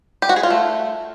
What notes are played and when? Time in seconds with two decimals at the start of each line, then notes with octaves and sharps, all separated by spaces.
0.22 G4
0.29 F#4
0.36 G#4
0.43 F4
0.50 A3